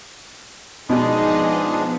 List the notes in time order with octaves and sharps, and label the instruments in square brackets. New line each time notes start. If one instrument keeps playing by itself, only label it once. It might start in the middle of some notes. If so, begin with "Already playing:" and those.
[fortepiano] B2 [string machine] F3 B3 [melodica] G#3 D4 [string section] D#4 G#4 D#5